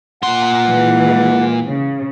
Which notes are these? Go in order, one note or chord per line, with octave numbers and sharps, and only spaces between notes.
A#2 F#5 C6
E3 G#3
C#3